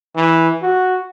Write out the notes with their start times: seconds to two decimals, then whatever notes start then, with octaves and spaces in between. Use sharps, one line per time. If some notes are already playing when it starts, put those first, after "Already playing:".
0.16 E3
0.62 F#4